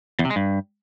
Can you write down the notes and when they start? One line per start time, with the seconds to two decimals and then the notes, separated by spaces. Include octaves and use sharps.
0.19 E2
0.25 C3
0.30 G#3
0.36 G2